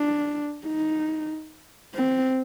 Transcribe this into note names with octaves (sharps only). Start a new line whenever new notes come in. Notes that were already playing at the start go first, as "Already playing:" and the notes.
Already playing: D4
D#4
C4